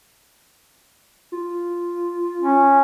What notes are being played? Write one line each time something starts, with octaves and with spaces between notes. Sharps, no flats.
F4
C#4